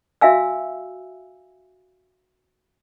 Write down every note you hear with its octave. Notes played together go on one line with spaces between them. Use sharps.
F#4 E5 F5 G#5 E6